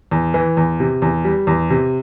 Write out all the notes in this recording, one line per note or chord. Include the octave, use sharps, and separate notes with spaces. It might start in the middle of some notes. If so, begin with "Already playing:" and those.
E2
E3
E2
C3
E2
G3
E2
C3